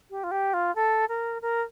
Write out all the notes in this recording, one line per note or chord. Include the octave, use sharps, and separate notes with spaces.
G4
F4
G4
F4
A4
A#4
A#4